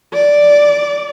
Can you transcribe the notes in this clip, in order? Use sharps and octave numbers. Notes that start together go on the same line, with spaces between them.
D5